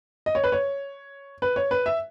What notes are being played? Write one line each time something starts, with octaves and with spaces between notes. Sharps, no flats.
D#5
C#5
B4
C#5
B4
C#5
B4
E5